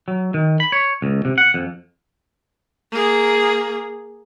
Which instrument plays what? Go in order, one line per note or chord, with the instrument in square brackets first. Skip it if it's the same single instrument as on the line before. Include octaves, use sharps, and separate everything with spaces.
[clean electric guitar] F#3
D#3
B5
C#5
C#2
C3
F#5
F2
[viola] A#3 G#4